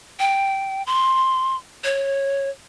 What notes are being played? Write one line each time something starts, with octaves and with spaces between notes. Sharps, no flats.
G5
C6
C#5